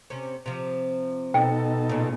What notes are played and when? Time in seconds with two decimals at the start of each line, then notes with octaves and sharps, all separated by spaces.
0.10 C3 C#4
0.46 C3 F3
1.34 B2 D#4 A4 G5
1.89 A#2 C#3